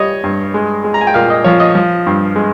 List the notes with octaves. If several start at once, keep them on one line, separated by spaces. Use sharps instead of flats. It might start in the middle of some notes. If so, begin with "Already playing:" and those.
Already playing: G3 C#5 D#5
G2
G#3
G#3
A#5
G#5
G5
A#2 F5
D#5
F3 C#5
D#5
F3
G2
G#3